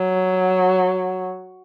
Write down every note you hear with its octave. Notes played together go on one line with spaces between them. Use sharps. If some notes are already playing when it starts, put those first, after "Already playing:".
Already playing: F#3